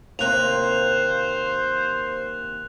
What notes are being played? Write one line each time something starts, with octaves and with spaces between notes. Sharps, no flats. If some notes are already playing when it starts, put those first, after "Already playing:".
D#2 C3 A#3 C5 F#6 F7